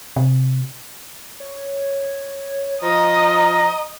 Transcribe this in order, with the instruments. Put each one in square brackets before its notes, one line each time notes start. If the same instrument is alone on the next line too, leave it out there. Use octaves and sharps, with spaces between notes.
[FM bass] C3
[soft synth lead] C#5
[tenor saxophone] F3 [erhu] D#5 [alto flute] A#5 [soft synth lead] A#6